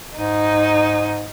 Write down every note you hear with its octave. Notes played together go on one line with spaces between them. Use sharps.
G#2 D#4